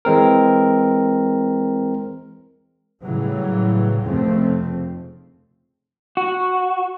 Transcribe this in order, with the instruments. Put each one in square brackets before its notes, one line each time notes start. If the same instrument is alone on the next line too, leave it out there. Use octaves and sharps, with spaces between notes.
[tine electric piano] E3 G#3 C4 A#4
[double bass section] A2 C#3 E3 F#3 G3
F1 F2 C#3 F3 A3 C4
[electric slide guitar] F#4